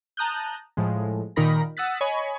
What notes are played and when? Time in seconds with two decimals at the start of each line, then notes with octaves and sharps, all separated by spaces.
0.17 A5 A#5 D#6 F#6 G6
0.77 A2 F3 G#3
1.36 A#2 D#3 D#4 A#4 B5 A#6
1.77 F#5 D#6 E6 F#6 A6 B6
2.01 C#5 D#5 G#5 B5 C#6